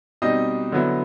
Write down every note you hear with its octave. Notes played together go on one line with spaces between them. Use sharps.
B2 G3 C4 D#4 D#5
D3 F#3 B3 E4